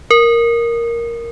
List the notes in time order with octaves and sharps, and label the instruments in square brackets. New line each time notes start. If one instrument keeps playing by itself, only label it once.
[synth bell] A#4